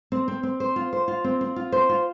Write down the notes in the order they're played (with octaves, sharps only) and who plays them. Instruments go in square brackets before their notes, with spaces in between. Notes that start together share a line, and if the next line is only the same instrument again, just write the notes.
[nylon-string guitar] C4
C4
C4
C5
F4
C5
F4
C4
C4
F4
C5
F4